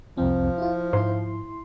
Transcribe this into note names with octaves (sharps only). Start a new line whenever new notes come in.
C2 F2 F3 C4
E4 F4
G#2 E4 C6